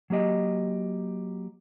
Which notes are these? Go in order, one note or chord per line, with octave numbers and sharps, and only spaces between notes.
F#3 A#3 G4 D#5